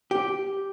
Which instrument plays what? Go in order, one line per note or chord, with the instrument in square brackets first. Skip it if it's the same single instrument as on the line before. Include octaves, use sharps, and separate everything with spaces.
[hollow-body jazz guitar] G4